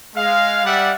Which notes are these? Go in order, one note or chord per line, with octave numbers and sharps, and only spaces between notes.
G#3 F5
G3 D5 E5 F#5